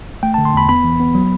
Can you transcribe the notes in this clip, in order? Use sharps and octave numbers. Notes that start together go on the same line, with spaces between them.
A3 G5
A5
D3
C6
E2 B5
B3 B5
E3
B3
F#3